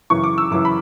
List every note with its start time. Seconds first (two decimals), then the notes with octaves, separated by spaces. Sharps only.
0.10 F#2 C#3 E3 C#6
0.24 D6
0.38 E6
0.51 F#2 C#3 E3 D6
0.65 B5